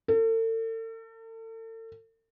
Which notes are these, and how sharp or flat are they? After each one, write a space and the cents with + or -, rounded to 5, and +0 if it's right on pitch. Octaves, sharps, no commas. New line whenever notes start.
A4 +40